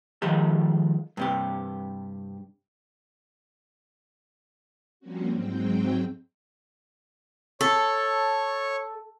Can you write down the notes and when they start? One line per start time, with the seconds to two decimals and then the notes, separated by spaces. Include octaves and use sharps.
0.22 D#3 F3 G#3 G4 A4
1.17 G2 C3 G4
5.00 F3 G3 A#3 C4 C#4 F#4
5.32 G#2 F#3 G#3 C4 G5
7.61 A4 C#5 C#6